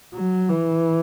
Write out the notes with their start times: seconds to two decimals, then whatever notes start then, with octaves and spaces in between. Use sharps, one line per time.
0.14 F#3
0.49 E3